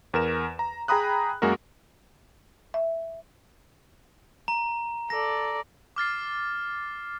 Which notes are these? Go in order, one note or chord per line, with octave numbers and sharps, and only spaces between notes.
E2 A#4 E7
A#5
G#4 G5 A#5 B5 D#6 F#6
F#2 G#3 A#3 F#4 A#4
E5
A#5
A4 D5 A#6
D6 F6 A6 C7